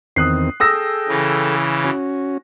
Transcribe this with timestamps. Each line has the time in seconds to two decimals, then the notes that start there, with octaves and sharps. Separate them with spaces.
0.16 E2 D#3 C4 D#6 F#6 C7
0.60 G#4 A4 G5 D#6 E6 A#6
1.09 C#3 E3
1.84 C#4 F#4